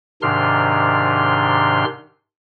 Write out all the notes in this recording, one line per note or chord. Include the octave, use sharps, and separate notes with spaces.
G#2 C3 D#3 D4 C6 F6